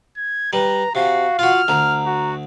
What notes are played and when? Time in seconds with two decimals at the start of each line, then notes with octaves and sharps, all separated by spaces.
0.17 G#6
0.53 G3 B4 A#5
0.95 C3 F#4 F5
1.39 F4 F#4 F6
1.68 D2 A#5
2.06 F#4